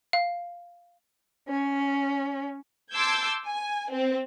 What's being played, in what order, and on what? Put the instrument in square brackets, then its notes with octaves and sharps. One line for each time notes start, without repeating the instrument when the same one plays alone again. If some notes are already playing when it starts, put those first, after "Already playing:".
[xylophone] F5
[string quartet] C#4
[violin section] A5 C6 D6 E6 G6 G#6
G#5
C4